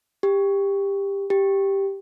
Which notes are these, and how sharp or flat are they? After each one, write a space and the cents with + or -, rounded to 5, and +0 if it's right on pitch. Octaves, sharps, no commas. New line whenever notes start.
G4 +15
G4 +0